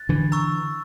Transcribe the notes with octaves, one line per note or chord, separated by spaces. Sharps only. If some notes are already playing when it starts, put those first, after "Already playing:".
Already playing: F#6 A6
D3 E3
A#5 C#6 E6